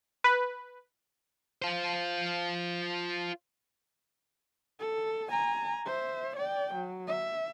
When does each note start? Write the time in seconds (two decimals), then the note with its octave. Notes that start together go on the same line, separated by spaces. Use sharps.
0.24 B4
1.62 F4 C5
4.80 A4
5.30 G#5 A#5
5.86 C5 E5
6.36 D5 G5
6.75 F#3
7.07 E5